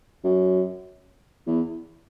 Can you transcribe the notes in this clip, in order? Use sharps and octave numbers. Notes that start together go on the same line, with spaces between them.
F#2
E2